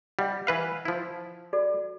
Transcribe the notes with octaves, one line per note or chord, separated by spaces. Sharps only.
G3 D#5 F#5
E3 B4 F5
F3 E4
F#4 A4 D5